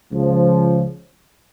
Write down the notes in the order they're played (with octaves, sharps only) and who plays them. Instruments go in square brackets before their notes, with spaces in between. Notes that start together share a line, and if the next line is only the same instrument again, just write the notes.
[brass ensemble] C#2 C#3 F3